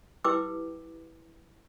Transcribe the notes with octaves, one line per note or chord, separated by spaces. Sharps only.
E4 G4 B4 G5 D6 E6